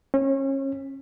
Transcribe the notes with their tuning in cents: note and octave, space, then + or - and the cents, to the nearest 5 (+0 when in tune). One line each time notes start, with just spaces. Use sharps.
C#4 -30